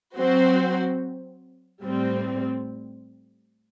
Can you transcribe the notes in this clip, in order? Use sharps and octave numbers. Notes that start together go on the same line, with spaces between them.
F#3 C4 F#4 C5
A2 G3 C4